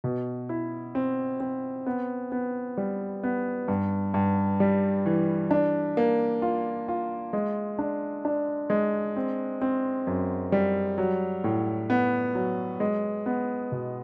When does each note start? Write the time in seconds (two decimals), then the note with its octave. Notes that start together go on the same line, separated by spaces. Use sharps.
0.04 B2
0.49 E4
0.95 C4
1.40 C4
1.86 B3
2.32 B3
2.77 G3
3.23 B3
3.68 G2
4.14 G2
4.60 G3
5.06 E3
5.51 D4
5.97 A#3
6.42 F4
6.88 F4
7.33 G#3
7.79 D4
8.25 D4
8.70 G#3
9.16 C4
9.62 C4
10.07 F#2
10.52 G3
10.98 F#3
11.44 A2
11.90 B3
12.35 F#3
12.80 G#3
13.26 B3
13.72 B2